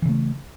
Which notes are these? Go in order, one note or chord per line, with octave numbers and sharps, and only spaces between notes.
C#3 E3 A3